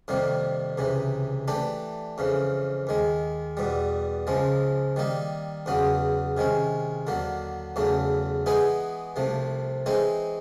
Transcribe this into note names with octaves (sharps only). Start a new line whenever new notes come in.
F2 C3 D#3 G3 A#3
C#2 C3 E3
E3 A3 D4 G4
F2 C#3 E3
D#2 D#3 G#3
E2 B2 G3
C#2 C#3 F3 G#3
D#3 G3 A#3 D#4
E2 C#3 F#3 B3
C3 D#3 G#3 C#4
D#2 D3 F#3 A#3
E2 C#3 F#3 A3
E3 G#3 B3 D#4 G#4
C2 C3 F3 A3
E3 G#3 C4 D#4